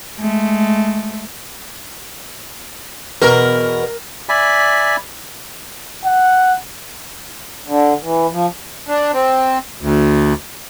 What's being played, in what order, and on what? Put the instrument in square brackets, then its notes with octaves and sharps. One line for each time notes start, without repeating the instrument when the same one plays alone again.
[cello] G#3 A3
[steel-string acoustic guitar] E2 B2 B4 [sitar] A#4
[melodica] D5 E5 G#5 B5
[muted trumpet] F#5
[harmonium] D3
E3
F3
[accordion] D4
C4
D2